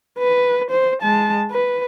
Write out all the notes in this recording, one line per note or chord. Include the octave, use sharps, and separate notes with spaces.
B4
C5
G#3 A5
B4